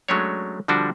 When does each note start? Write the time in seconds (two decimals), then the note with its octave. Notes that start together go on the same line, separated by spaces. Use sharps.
0.08 F#3 G#3 A3 C#4 D4 C#5
0.68 D3 F3 G3 D4 F#4